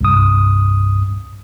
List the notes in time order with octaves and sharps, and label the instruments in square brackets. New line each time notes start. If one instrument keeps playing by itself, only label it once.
[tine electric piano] C2 G2 D#6